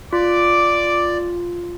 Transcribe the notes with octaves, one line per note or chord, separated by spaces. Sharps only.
F4 D5 D6